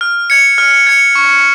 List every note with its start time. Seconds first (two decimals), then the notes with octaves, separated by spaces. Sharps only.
0.01 F6
0.30 G#6 C#7
0.58 F6
0.87 G#6 C#7
1.15 C#6